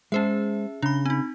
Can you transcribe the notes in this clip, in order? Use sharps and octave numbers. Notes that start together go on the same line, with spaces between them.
G#3 C#4 G#4 C5 E5
C#3 D4 B5
C4 D#4